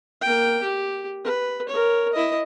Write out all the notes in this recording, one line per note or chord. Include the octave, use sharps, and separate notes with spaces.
A#3 G5
G4
B4
A#4 C#5
E4 D#5